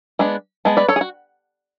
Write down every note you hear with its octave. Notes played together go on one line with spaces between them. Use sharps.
G#3 B3 D4
G#3 B3 A5
B4 D5
A4 C#5
G#4
F#4